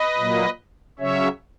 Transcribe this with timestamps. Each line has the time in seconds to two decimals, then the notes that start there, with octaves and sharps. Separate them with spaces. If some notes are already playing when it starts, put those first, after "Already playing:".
Already playing: B4 D#5
0.17 A#2 F#3 A#3
0.99 C#3 F#3 C#4 C#5 E5